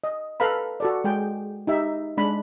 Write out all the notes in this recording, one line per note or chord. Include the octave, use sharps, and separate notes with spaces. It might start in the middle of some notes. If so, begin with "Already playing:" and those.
D#5
A4 B4 F5 A#5 B5
F#4 A4 D5
G#3 G#4 G5
D#4 G4 E5
G#3 D4 B5